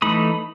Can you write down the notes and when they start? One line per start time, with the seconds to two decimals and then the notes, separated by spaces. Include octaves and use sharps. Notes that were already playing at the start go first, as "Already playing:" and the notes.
0.02 E3 A3 D#4 B5 D#6